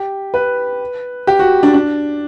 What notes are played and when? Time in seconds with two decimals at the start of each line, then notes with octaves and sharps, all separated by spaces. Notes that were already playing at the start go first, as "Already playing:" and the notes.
Already playing: G4
0.34 B4
1.27 G4
1.39 F#4
1.63 D4
1.74 D4